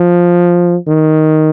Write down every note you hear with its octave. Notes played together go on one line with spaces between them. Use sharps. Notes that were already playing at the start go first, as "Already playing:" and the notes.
Already playing: F3
D#3